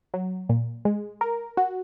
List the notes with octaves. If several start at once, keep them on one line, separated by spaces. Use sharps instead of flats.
F#3
A#2
G#3
A#4
F#4